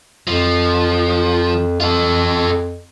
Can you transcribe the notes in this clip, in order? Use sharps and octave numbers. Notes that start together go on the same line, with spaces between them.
F2 F3
F2 F4 A4